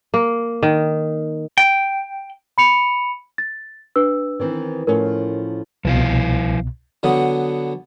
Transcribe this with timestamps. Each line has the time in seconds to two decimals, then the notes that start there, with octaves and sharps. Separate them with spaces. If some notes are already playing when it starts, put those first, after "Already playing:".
0.14 A#3
0.63 D#3
1.58 G5
2.58 B5 C#7 F7
3.38 A6
3.96 D4 B4 E6
4.40 D#3 E3 C4
4.87 A2 F3 C#4 A#4
5.85 C2 B2 F3 E4 F5
7.03 D3 F#3 B3 D#6